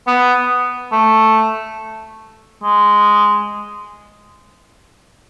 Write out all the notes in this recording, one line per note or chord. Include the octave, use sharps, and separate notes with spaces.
B3
A3
G#3